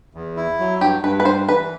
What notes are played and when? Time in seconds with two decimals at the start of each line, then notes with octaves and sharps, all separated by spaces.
0.15 E2
0.37 E4
0.60 F#3
0.81 G2 G4
1.03 G2 B4
1.20 B4
1.25 G3 C5
1.48 E3 B4